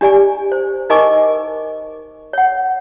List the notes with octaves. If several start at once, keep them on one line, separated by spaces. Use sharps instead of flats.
D4 G4 D5 G#5
C5
D#4 A#4 D#5 G#5 C#6 D6
C#5 F#5